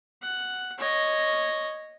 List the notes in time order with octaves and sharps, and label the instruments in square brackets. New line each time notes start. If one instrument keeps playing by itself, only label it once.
[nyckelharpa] F#5
C#5 D#5